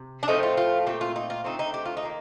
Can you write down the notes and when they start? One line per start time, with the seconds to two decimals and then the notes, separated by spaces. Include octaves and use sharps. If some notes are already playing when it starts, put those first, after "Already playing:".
Already playing: C3
0.23 D4
0.28 A2 F3 A3 C4 D#4
0.43 F4
0.57 F4
0.86 A#2 A3 C4 G4
1.01 F4
1.16 D#4
1.30 F4
1.44 D3 A3 C4 D#4
1.59 D#4
1.74 G4
1.85 F4
1.97 D#4
2.03 D#3 A#3